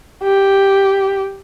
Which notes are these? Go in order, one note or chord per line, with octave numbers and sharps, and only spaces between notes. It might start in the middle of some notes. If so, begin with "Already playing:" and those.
G4